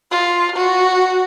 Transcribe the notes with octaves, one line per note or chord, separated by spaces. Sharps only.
F4
F#4